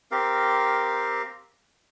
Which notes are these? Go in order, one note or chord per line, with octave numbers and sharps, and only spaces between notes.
C4 G4 A#4 F5